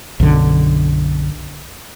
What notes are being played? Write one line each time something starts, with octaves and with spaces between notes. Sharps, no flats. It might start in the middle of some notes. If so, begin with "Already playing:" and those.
B1 F#2 D3